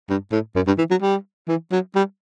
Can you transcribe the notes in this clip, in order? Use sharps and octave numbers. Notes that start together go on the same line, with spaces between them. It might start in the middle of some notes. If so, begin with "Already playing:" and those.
G2
A2
F#2
G2
E3
F#3
G3
E3
F#3
G3